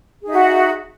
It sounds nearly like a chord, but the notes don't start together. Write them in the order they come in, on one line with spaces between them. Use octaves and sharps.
G#4 D#4 E5 F#4